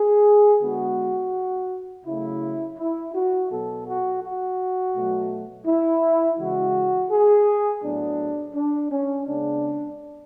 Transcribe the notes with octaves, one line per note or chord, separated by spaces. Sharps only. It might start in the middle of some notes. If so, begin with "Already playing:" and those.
Already playing: G#4
D3 G#3 B3 F#4
C#3 F#3 A3 E4
E4
F#4
B2 F#3 B3 A4
F#4
F#4
B2 F#3 A3
E4
C#3 E3 G#3 F#4
G#4
A2 F#3 B3 D4
D4
C#4
C#3 G#3 B3 D4